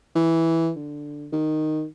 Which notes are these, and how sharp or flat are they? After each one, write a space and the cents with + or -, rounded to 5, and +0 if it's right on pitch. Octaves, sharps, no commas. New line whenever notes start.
E3 -5
D3 +0
D#3 -5